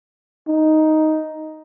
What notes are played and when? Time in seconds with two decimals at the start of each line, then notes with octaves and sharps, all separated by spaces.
0.48 D#4